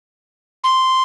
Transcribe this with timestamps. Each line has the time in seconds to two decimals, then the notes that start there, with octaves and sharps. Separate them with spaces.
0.64 C6